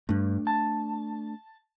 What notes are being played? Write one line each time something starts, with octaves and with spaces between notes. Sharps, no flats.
G2 A3 D4
A5